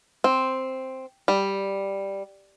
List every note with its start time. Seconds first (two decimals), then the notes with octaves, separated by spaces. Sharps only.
0.24 C4
1.28 G3